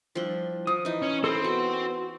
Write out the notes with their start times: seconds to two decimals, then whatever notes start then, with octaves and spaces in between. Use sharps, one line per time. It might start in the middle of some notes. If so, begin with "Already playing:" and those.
0.15 F3 G3 D4 E4 F4
0.67 F3 D#6
0.85 E3 D#4 D#5
1.02 C#4
1.24 C4 E4 A4 A#4 B5
1.44 B3 F#4 B4 C#6